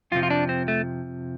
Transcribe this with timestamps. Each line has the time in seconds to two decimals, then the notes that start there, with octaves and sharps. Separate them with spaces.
0.12 F2 F4
0.15 C3 F3
0.23 F4
0.30 D4
0.49 C4
0.68 A3